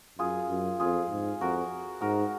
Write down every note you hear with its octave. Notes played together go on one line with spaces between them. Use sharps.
F#2 F4 G#4
F#2
F2 F4 G#4
G#2
F2 F#4 A#4
G#2 F#4 A#4